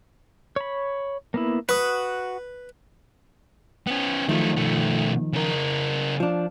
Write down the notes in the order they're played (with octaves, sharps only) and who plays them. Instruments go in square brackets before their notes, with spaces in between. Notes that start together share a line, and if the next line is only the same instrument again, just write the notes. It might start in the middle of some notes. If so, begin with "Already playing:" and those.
[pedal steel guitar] C#5 B5
A#3 B3 E4
[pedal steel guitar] F#4 D#6 [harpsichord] B4
[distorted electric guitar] B3 C#4
[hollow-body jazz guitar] D#3 F3 [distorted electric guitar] F#3 A3
[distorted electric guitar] B1 A3
C#3 A#4
[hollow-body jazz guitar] F3 D4